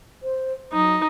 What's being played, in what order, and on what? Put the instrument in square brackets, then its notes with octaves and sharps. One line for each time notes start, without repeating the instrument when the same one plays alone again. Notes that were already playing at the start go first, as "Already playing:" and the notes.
[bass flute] C5
[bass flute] F#3 [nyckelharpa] D#4